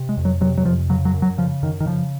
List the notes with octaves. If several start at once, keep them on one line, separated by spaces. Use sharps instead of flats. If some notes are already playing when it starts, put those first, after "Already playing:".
Already playing: C3
G#3
F2
F#3
C3 F#3
F#3
F2 F3
C#3 F#3
F#3
F#2
F#3
C#3 F3
F#2 D#3
D#3
C#3 F3